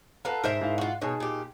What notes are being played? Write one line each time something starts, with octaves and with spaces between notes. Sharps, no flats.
F4 A4 B4 F#5 A#5
G#2 A#4 C5 E5
G#2 E4 F5
F4 F#4
B2 D#4 G#4 C#5 A5
A#2 G4